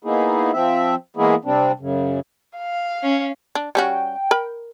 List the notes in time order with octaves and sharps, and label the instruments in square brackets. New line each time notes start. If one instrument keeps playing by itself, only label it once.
[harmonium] A#3 B3 D#4 E4 G#4
F3 C4 E5
E3 G#3 A#3 B3 E4 G#4
C3 G3 C4 D4
F#2 C#3
[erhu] F5
[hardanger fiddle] C#4
[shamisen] D4
[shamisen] G3 C#4 F#4 [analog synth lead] G5
[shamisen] A#4 B5